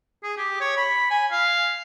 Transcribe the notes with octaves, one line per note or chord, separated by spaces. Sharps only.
G#4
G4
C#5
B5
G#5
F5